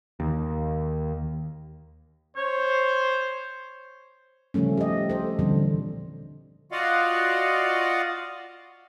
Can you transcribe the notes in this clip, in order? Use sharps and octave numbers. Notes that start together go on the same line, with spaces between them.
D#2
C5 C#5
C#3 F3 G3 A3 C#4
G4 D#5
A4 C5
A#2 D3 E3 F3 G3 C4
F4 F#4 D5 D#5 F5 F#5